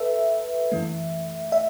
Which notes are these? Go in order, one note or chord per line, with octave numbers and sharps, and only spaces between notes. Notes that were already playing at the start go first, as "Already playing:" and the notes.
Already playing: A4 B4 E5
F#2 E3 A3
E5